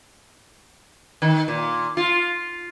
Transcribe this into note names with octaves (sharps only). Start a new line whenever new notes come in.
D#3
A#2
F4